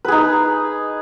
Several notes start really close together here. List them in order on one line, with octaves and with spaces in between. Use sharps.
B4 G#4 D#4